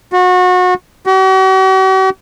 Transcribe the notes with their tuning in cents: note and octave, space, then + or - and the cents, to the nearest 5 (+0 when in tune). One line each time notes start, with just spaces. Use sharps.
F#4 -30
F#4 +45